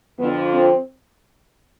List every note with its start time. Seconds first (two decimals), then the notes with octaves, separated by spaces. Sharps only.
0.19 F2 D3 F3 B3
0.54 C4